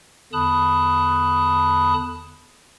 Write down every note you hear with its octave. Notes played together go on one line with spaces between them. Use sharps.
E2 D3 A5 B5 D#6 F#6